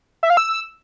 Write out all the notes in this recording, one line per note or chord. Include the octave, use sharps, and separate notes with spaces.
E5
F5
E6